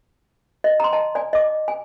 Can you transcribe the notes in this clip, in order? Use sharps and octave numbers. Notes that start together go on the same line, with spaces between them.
D#5
A#5 C6
D#5 A5 A#5
D5 G#5
D#5 D6
G#5